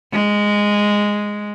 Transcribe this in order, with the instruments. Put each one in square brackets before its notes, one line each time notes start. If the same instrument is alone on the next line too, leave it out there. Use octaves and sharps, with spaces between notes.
[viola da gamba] G#3